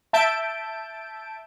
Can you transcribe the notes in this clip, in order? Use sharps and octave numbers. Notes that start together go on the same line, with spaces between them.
E5 A5 G6 D7